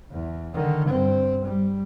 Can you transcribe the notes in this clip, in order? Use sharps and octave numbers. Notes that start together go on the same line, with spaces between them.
E2
D3 D#3
G2 C4
G3